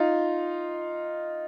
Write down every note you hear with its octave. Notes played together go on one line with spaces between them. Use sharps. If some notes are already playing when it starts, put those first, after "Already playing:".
Already playing: D#4 F4